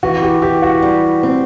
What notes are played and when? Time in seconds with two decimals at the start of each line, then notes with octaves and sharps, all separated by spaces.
0.03 E3 F#4
0.22 G4
0.42 E3 G4
0.62 F#4
0.82 G3
1.23 C4